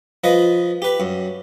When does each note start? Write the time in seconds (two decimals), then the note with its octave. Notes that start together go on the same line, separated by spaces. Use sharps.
0.24 F3 B4 D#5
0.82 G4 B4
1.00 F#2